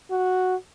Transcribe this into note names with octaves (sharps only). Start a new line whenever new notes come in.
F#4